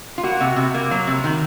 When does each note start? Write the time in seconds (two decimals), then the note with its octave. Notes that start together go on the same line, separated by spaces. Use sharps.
0.18 F4
0.23 A#3 F#4
0.41 C3
0.57 C3
0.74 A#3
0.91 F#3
1.07 C3
1.24 D#3